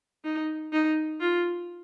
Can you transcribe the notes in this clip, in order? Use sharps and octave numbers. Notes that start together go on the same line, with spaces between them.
D#4
D#4
F4